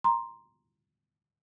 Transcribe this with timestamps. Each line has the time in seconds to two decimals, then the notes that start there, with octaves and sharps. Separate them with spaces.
0.04 A#5 C6